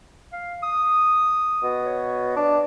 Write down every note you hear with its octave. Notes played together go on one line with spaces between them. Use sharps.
F5
D#6
B2
C#5
D4